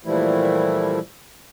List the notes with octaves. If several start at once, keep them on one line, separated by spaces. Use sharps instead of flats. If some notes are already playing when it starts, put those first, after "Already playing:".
A#2 E3 F3 G3 A3 E4